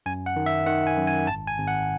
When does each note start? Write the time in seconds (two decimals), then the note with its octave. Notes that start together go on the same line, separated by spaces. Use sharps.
0.06 F#2 G#5
0.26 F#5
0.36 D#3
0.46 E5
0.66 D#3 F#5
0.87 G#5
0.97 F#2
1.07 G#5
1.27 G#1 A5
1.47 G#5
1.58 G#1
1.67 F#5